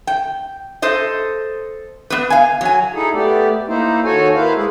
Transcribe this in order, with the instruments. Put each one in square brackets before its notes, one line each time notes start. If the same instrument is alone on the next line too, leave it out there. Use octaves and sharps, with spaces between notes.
[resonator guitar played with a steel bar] G5
A4 C5 D#5
B3 B4
F5 G#5
F#3 G#5
[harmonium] D#4 E4 G#4 A4
A3 B3 G4 D5
A#3 D#4 E4 C5
D#2 F#4 A4 C#5 G#5
A#3 E4 B4 C5 F5
G#3 G#4